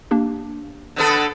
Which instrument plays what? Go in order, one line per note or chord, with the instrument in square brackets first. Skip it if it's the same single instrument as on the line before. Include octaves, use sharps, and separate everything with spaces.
[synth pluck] A#3 D4 G4
[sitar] D3 B3 A4